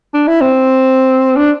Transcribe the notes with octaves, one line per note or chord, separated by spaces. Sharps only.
D4
E4
C4
D4